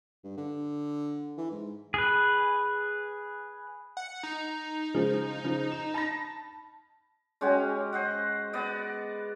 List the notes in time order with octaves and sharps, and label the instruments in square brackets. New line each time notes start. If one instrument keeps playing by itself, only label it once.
[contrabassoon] G2
D3
E3
G#2
[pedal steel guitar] G#4 B4
[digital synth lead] F#5
D#4
[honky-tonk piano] C#3 F3 G#3
C#3 F3
E7
A5 B5 A#6
[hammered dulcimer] G#3 C#4 F#4 G4
C5 D#5 F#5
B3 D5 D#5